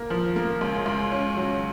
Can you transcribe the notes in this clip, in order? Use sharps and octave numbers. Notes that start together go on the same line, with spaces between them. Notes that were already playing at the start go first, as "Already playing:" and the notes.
Already playing: A#3
F3
A#3
C#2
C#2
C#4
F#3